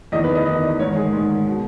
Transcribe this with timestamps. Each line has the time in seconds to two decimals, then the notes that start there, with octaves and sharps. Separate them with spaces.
0.12 E2 D#3 D#5
0.24 B4
0.35 D#5
0.46 E2 D#3 D#5
0.79 G#2 C#5
0.82 D#3
0.96 G#4
1.12 G#2 D#3
1.46 B2